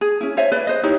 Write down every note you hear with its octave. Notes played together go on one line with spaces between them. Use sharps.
G#4
C#4 E4
C5 C#5 E5 G#5
B4 D5
C5 D#5
D#4 E4 G4 C#5